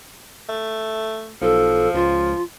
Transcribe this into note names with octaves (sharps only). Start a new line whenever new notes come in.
A3
B1 F3 A4
C#2 F4